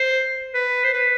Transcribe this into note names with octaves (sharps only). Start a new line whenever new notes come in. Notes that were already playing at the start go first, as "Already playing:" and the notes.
Already playing: C5
B4
C5
B4